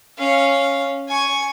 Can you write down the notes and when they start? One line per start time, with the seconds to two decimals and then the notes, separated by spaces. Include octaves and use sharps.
0.18 C#4 F5
1.08 G#5 C#6